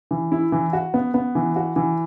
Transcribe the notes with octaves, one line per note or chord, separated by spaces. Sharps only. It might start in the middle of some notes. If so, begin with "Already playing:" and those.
E3
E4
E3
F#4
B3
B3
E3
F#4
E3